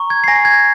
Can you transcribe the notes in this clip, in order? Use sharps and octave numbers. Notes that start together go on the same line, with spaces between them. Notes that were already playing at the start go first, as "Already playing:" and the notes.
Already playing: A#5 C#6
G#6
C7
G#5 A#6
G#6